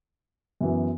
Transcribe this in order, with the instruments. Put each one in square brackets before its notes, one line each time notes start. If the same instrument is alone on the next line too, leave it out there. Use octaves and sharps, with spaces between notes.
[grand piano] F#2 E3 B3